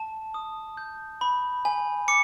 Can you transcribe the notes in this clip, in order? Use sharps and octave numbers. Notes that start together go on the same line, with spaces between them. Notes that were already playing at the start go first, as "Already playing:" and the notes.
Already playing: A5
D#6
G6
B5
G#5
D6 C#7